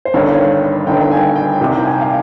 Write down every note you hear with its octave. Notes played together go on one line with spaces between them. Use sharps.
C5
G1 G2 D#3 C#5
C#5
G1 G2 D#3 G5
G5
G#5
G5
C2 C3 D#3
G5
G#5
F5